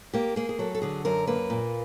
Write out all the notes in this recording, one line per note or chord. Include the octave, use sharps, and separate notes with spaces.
A#3 G4
A#3 G#4
G#4
F#3 A4
A4
D3 G#4
F#2 A#4
A#3 B4
A#2